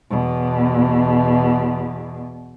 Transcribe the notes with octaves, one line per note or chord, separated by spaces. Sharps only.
E2 B2